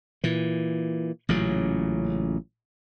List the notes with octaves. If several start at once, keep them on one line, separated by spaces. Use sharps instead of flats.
A#2 E3
A1 A#2 C#3 F#3